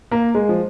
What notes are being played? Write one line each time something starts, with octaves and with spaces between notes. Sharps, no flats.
A#3
G#3
F3